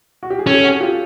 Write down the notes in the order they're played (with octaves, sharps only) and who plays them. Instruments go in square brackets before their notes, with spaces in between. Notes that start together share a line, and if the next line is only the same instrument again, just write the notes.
[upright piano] F#4
G4
G#4
[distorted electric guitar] C#4 [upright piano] G4 A4
[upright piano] F#4 G#4
F4 G4